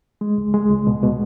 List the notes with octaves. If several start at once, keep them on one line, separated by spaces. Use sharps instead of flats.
G#3
C#2
G#3
C#2
B2
B2